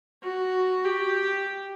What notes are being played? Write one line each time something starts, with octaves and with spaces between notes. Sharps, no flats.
F#4
G4